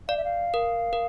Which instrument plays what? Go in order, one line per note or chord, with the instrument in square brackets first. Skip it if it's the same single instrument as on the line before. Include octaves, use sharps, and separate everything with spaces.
[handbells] D5 [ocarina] F5
[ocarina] E5
F5
[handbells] A#4
A#4